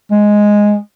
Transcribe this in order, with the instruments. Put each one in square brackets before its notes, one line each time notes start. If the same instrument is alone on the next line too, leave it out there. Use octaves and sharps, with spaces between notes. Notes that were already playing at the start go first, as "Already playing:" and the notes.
[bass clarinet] G#3